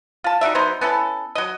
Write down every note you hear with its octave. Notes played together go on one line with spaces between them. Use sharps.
F4 A5
D#4 F#4 D5 E5
F#3 B3 D#4 C5
B3 C#4 E4 A4
F#3 D#5